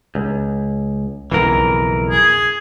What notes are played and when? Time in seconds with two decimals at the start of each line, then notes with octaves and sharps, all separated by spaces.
0.15 C#2
1.31 B1 F2 C#3 E3 A#4
2.10 G#4